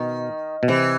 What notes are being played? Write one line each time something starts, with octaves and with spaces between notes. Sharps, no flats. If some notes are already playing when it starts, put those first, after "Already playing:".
Already playing: B2 D#3
B2
C3 E3